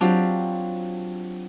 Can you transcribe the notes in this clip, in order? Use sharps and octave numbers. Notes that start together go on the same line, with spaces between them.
F#3 C4 D4 F4 G4